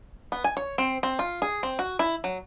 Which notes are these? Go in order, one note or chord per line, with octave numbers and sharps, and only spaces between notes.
B3
G#5
C#5
C4
C4
F4
G#4
C4
F#4
E4
F#3